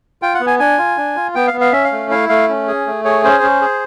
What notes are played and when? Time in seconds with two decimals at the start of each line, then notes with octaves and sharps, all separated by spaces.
0.22 F4 G5
0.34 F#5
0.41 B3
0.47 G#5
0.59 D4 G#5
0.78 F4
0.97 D4
1.16 F4
1.35 B3 G5
1.47 F5
1.53 B3
1.61 F5
1.72 C#4 E5
1.84 F5
1.92 A3
2.11 E4 F5
2.29 A3 F5
2.49 C#4
2.68 G#4
2.87 A3
3.05 G#4 C#5
3.24 C#4 C5
3.43 C#4
3.61 G#4